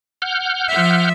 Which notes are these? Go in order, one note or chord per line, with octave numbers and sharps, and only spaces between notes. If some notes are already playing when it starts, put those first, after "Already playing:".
F#5 F6 G6
F3 E5